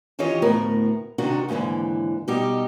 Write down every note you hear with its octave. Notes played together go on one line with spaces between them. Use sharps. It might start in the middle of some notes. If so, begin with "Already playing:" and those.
D#3 E3 F4 G4 C#5 D#5
D2 A2 B3 A#4
C3 D#3 D4 F#4
D#2 G#2 B2 D3 E3
B2 G3 D#4 G4